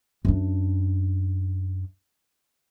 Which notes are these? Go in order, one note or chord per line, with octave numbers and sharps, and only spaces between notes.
F#2 D4